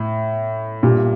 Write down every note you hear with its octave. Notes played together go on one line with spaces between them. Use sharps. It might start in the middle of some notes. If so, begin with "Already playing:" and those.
Already playing: A2
G2 A#2